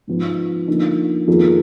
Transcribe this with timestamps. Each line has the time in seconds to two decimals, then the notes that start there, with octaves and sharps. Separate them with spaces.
0.07 G#2 F3 B3
0.68 D3 F3 A#3 D#4
1.28 F2 D#3 A#3 F4 G#4